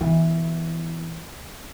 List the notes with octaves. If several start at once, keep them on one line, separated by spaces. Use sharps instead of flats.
B2 E3